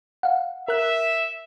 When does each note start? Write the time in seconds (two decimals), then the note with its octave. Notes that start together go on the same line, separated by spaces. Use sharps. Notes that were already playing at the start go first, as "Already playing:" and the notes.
0.23 F5 F#5
0.68 A#4 E5 F#6